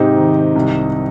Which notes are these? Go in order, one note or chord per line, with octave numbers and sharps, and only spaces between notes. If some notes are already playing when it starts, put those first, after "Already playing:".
Already playing: G#2 C3 D#4 G4
D#3
C2